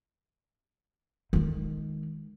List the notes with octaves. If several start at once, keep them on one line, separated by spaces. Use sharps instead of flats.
D#3 G#3